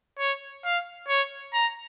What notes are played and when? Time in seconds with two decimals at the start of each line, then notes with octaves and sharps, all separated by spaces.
0.19 C#5
0.65 F5
1.08 C#5
1.54 A#5